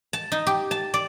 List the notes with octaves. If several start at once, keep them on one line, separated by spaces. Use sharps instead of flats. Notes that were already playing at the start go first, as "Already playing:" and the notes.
A5
D#4
G4
A5
D5